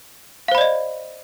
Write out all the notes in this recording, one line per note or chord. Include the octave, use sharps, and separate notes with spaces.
C5 D5 D#5 F5 B5